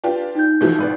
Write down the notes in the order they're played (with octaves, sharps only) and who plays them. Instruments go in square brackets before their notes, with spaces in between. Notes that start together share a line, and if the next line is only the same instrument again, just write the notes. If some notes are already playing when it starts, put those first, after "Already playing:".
[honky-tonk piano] D4 F4 G4 [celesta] B4
[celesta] D#4 G6
[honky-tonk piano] B2 E3 F3
G#1 B4 D5